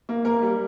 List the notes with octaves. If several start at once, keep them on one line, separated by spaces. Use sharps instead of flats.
A#3
A#3 A#4
G3